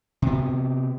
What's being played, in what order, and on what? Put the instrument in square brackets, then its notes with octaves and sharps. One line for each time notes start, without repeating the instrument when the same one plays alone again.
[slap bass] C3 B3